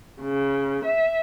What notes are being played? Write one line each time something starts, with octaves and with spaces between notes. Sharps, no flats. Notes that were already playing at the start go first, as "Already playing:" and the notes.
C#3
E5